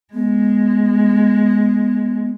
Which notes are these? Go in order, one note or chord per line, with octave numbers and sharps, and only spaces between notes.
G#3 B3